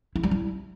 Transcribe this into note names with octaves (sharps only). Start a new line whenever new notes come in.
E4
G3
E4